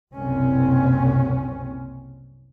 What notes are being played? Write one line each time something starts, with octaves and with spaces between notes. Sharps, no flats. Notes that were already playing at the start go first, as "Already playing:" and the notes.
F#1 C2 B2 C4 C#4